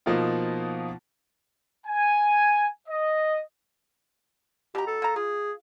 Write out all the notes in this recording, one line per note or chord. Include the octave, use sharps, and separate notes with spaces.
B2 F3 A#3 D#4 F4
G#5
D#5
B2 G4 A#5
A4
A#3 A#5
F4 G#4